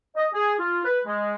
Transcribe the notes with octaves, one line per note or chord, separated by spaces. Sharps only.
D#5
G#4
F4
B4
G#3